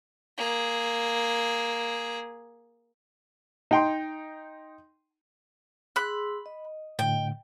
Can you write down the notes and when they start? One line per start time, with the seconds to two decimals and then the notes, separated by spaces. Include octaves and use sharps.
0.38 A#3 G#4
3.71 D#4 G5 C6
5.96 G#4 B5 C6 E6 F#6
6.46 D#5
6.99 A2 D3 G5